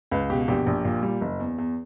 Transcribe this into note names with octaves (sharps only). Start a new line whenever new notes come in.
C#2 B4
B2 G4
A#1 G4
A#1
A#2
G3
F#1
E2
E2